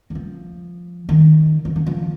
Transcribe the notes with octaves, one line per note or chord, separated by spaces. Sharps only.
D#3
F3
D#3
F3
D#3
F3